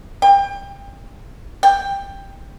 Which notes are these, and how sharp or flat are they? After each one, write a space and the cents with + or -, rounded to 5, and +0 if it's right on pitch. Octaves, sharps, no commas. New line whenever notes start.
G5 +30
G5 +10